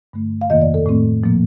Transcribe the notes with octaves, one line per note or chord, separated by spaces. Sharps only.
G2 D3 A3
F5
F2 C3 D#3 A#3 D#5
D5
A4
A2 A3 C4
A#2 F3 A#3